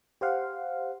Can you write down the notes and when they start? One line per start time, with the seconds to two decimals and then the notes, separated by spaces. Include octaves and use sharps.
0.21 G4 C5 F5 F#5